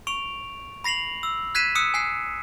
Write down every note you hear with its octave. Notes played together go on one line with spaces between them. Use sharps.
C#6 D7 F7
B5 A#6 C7 F7 F#7
E6
F#6 G#6 B6 C7 D#7 E7
D#6 E6 F#6 C#7
G#5 F#6 C7